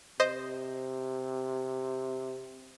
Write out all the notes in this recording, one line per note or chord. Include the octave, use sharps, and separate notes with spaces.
C3 C5 D#5